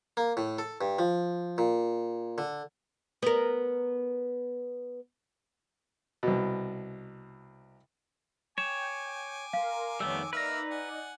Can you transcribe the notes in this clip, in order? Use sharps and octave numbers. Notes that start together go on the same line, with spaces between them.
A#3
A2
A4
G2
F3
A#2
D3
B3 A#4
C2 B2
C#5 G5 G#5 D6 E7
A#4 F5 C6
F2 D#3 G3 A3 B3 C#5 E6
A#3 D#4 B4 D5 E5 A#5 F6
F#5 G#5